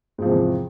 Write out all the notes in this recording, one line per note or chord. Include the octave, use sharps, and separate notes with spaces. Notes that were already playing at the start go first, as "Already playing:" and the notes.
E2 G#2 C3 F3